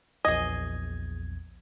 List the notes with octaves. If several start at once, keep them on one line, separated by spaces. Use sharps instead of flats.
A#1 E2 G#4 D#5 G#6